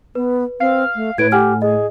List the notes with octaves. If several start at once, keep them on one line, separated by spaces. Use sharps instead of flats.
B3 B4
C4 F5
A3
A2 B4 G#6 D7
G4 F#5 G#5 F6
G#4 D#5